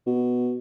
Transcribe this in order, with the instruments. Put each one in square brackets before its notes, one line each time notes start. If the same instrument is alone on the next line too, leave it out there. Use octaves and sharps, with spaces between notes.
[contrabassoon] B2